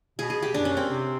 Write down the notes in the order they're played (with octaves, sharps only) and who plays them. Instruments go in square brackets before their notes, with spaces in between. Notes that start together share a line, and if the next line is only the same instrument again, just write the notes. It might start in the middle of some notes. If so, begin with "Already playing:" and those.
[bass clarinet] B2 [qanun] G#4
[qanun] G#4
G4
[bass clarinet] F#2 [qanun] D4
[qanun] C#4
C4
[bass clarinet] C3